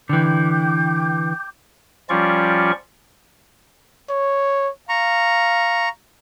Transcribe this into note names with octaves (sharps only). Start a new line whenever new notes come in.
D3 E3 G5 D6 G6
F3 G3 C#4 F4 D5 C#6
C#5
F5 A#5 C#6